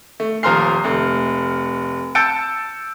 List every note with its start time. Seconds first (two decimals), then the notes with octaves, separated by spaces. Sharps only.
0.20 A3
0.43 D#1 F3 A#5 C6 F6 C7
0.84 F1 A3
2.15 A5 E6 G6 A6 C#7 D7